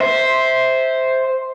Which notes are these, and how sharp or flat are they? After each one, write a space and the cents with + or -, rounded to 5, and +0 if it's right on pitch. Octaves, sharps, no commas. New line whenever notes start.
C5 +0 E5 -15